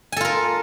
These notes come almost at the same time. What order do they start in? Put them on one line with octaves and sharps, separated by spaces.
G#5 A4 F4 A#4